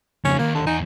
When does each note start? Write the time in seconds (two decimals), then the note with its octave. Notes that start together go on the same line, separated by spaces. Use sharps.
0.25 F2 C#3 C#4
0.39 D#2 A#3
0.55 D3
0.66 E2 D#4 G#5